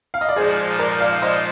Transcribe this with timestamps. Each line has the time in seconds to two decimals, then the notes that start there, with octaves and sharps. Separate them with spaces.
0.14 F5
0.21 D#5
0.29 D5
0.36 A#2 F3 G#3 D#4 G#4 C5
0.79 A#4 D5
1.00 D5 F5
1.22 C5 D#5